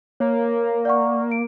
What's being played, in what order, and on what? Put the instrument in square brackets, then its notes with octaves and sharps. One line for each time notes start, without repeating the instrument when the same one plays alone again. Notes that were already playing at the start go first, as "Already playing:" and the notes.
[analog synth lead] A#3 [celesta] C#5
[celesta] D5 F#5 C#6
D7